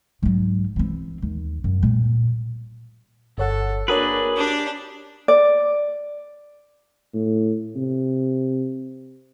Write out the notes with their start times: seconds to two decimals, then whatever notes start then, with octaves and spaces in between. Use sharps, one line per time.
0.23 G#2 F#3
0.76 E3 C4
1.22 D#2
1.64 F#2
1.83 A#2 G3
3.38 G1 A4 C#5 F#5
3.88 A#3 D4 F#4 G#4 A#4 B4 C#5
4.37 D4 G4 D5
5.28 D5
7.14 A2
7.76 C3